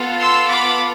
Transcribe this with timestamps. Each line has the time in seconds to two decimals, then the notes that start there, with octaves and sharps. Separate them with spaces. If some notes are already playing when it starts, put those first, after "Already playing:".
Already playing: B3 F4 A4
0.20 C6 E6
0.47 B5 D6